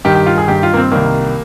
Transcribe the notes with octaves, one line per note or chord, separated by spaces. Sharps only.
G2 D#3 G4
G4
F4
G#4
G2 D#3 G4
F4
A#3
C4
C2 C3 D#3 A#3